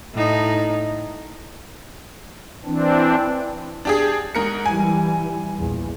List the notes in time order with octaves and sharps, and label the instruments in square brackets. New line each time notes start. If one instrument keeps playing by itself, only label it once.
[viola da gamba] A2 D#4
[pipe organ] E3 C4 D4
[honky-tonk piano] D4 G4 G#4
G#2 A#4 C#7
[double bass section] E3 G3 [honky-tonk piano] G#5
[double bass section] A#1 E2